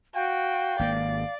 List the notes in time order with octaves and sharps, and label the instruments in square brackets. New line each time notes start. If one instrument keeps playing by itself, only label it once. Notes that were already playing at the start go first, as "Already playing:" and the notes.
[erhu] F#4 [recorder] F5 [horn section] G5
[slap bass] G#1 A#3 [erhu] D5